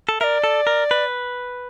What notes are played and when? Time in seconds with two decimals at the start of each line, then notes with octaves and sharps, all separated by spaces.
0.09 A4
0.20 A#4 D5 E5
0.44 A4
0.67 A#4
0.91 B4